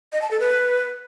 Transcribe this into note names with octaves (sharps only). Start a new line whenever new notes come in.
D#5
A5
A4
B4